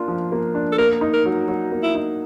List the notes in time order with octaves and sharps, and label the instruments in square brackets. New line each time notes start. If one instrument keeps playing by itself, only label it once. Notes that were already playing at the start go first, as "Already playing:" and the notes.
Already playing: [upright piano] A#3 D4 F4
F3
A#3
D4
[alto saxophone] A4
[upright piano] A#3 [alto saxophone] A#4
[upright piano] D#4
[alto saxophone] A#4
[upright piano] F#3
F#3
A#3
[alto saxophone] E4
[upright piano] D#4